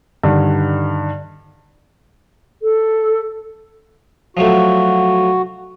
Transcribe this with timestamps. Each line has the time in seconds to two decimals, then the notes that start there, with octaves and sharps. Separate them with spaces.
0.24 G2 D3 D#3
2.62 A4
4.37 F3 F#3 A3 F#4